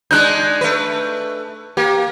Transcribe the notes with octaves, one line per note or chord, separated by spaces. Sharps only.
G#3 D4 D#4 F#6 G6
A3 B4
A#3 G4